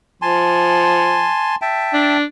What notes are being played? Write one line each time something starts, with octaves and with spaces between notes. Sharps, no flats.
F3 G#5 A5 C6
E5 G5 A5
D4